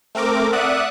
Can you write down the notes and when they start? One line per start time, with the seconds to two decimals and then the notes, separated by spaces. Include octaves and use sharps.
0.15 A3 C4 A#4 D6
0.53 D5 E5 F#5 D#6 F#6